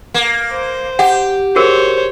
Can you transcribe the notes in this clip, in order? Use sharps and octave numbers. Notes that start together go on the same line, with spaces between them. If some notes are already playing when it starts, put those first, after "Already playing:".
A#3
C5
G4 F#5
F#4 G#4 A#4 C5 C#5